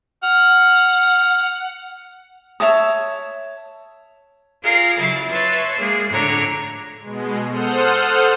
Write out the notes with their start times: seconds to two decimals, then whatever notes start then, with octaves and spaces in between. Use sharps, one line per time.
0.23 F#5 F6
2.60 C#5 E5 A5 D#6
4.63 F4 G#4 A#4 D5 F5
4.98 C#3 F#3 E4 A6
5.29 B4 C#5 E5 A5 C6
5.79 G#3 A#3 G#4
6.09 F2 A2 D3 D4 C#5 A#5
7.01 B2 G#3
7.50 A4 C5 F#5 D#6 F6 G6